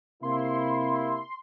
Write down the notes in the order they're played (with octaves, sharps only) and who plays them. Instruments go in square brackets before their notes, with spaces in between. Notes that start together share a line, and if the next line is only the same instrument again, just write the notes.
[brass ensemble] C3 A#3 E4 [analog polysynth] C6